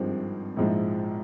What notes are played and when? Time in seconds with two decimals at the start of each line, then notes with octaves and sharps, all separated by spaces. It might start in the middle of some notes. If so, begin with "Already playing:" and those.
Already playing: G#1 G2 F3 G#3 C4
0.57 A#1 G#2 F3 G#3 E4